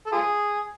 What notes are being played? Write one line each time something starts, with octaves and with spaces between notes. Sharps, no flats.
A4
F4 G#4